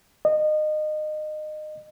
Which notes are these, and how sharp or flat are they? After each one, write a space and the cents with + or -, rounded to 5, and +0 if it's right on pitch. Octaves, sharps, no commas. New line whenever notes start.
D#5 -25